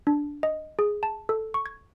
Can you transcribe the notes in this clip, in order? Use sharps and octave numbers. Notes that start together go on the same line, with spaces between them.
D4
D#5
G#4
A5
A4
C#6
G#6